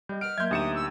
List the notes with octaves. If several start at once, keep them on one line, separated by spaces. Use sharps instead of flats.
G3 D#5 G6
B4 F#5 F6 D7
F#3 A#3 E5 C6 G6 G#6
D2 D#4 G4 D#6 C#7 E7
E6